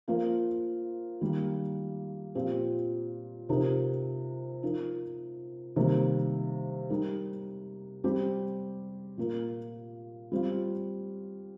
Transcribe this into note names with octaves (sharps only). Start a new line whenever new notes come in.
F3 A#3 F4 A#4
D#3 G3 A#3
A#2 F3 C4 G4
C3 F3 D#4 G4 A#4
F3 D#4 A#4
C3 D#3 G3 A#3
G3 D#4 G4 A#4
G3 C4 G4
A#2 A#3 F4 A#4
G3 C4 F4